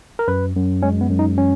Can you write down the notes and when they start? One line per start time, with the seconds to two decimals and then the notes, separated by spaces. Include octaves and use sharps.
0.19 A#4
0.28 F#2 B4
0.56 F#2
0.82 G#3 C#4
1.01 B3
1.10 F#2
1.19 D#4
1.37 E3 C#4